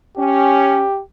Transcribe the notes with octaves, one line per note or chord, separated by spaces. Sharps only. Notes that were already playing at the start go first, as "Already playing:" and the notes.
C#4 G4